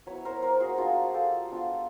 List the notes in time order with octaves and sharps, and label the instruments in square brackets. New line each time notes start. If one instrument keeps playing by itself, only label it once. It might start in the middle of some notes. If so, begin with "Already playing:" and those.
[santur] F#3 B3 E4 B4 C#5
A#4 C5
A#4 C5
F#4 G#4
A#3 D4 F4 F#4 G#4
G4 A4
G#3 B3 D4 F4